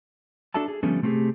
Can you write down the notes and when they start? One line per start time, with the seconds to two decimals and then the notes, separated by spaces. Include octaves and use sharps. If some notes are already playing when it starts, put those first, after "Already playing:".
0.54 D4 F#4 A4 E5 A5
0.68 G#4
0.83 D3 F3 G3 A3 B3 C#4
1.02 C3 A3 C4 E4 G4 G#4